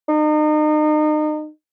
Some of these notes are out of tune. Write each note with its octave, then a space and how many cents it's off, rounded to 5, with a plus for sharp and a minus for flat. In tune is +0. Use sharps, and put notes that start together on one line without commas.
D#4 -35